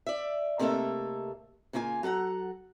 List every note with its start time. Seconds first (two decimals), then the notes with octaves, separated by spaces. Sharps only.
0.07 D5 E5
0.59 C3 A3 A#3 D#4 A4 E5
1.73 C#3 A#3 F4 E5 G#5
2.03 F#3 A4 F#5 A#5